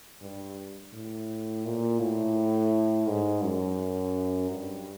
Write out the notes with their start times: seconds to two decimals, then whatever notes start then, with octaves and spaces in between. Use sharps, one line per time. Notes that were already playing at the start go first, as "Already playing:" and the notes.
0.22 G2
0.93 A2
1.65 A#2
2.00 A2
3.07 G#2
3.44 F#2
4.51 G2